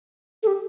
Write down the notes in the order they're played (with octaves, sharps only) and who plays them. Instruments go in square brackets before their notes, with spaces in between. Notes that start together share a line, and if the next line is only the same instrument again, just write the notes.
[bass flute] A4
G4